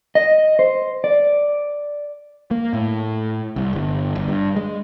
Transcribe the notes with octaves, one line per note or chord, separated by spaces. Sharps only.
D#5
C5
D5
A#3
A2
C2
G1
G1
G2
G#3